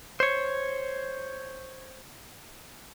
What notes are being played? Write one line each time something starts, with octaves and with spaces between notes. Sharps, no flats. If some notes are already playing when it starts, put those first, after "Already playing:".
C5 C#5